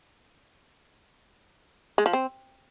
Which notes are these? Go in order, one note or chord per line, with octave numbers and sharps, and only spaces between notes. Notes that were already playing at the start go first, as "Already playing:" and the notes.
G#3
F3
C4